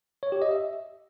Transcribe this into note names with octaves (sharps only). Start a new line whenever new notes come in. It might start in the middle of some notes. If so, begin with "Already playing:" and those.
C#5
G4
D#5
E5